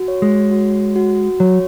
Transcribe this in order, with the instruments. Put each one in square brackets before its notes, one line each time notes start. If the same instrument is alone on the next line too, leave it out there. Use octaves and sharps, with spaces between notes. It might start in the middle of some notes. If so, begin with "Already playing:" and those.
Already playing: [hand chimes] F#4
C#5
[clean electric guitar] G#3
[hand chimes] F#4
F#4
[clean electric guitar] F#3 [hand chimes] C#5